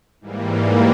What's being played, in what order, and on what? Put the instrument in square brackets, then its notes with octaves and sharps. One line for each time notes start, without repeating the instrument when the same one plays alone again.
[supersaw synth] G#2 E3 G3 A#3